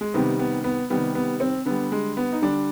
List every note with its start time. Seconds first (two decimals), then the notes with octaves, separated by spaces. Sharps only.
0.01 G#3
0.14 C3 D#3 G3 B3
0.39 B3
0.64 B3
0.90 C3 D#3 G3 B3
1.15 B3
1.40 C4
1.66 D3 G3 B3
1.92 G#3
2.17 B3
2.32 D#4
2.42 D3 G3 D4